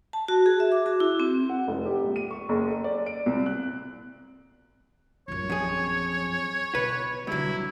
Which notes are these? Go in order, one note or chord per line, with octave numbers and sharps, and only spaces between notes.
A5
F#4
G#4
E5
D6
F#4
E4
C4
F#5
F1
G4
A#1
D#7
C#6
F#1
A4
D5
D7
C2
F#6
A#1 F#2 C#5
F2 G#4
B2 B4
B1 G2 D3 F#3 E4